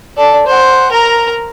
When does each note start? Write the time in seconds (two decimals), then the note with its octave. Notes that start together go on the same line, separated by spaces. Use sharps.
0.17 A4 D5
0.46 C5 F#5
0.92 A#4 A#5